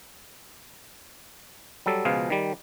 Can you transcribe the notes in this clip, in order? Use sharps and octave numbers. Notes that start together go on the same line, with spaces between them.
F#3 G3 A4
C#2 B2 F3 G#4 F5
D#3 G3